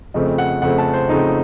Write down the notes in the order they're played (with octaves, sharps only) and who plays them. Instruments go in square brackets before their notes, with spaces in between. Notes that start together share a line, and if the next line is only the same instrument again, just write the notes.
[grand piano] F2 C#3 A3 C4 D#5
F#5
F2 C#3 A3 C4 F#5
A5
C5
F2 C#3 A3 C4 D#4